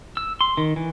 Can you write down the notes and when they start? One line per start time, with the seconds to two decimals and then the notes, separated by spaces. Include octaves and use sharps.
0.17 E6
0.41 C6
0.57 D#3
0.76 E3